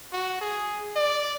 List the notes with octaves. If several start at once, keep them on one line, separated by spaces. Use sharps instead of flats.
F#4
G#4
D5